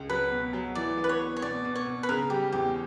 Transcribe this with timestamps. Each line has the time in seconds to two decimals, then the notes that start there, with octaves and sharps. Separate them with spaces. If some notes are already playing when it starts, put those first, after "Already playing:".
Already playing: C#2
0.09 F#3 B4
0.32 B2
0.53 F#3
0.75 E3 D5
0.97 B3
1.04 B4
1.09 C#5
1.21 B3
1.37 C#5
1.42 B2 D5
1.64 B2
1.75 C#5
1.86 B2
2.03 B4
2.09 C#3 A#4
2.30 G3 G4
2.53 E2 G4